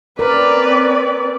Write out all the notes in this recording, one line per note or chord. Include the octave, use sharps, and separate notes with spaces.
C4 C#4 A#4 B4 D5